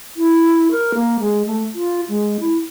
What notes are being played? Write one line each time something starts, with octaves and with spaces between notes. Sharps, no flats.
E4
A#4
A#3
G#3
A3
F4
G#3
E4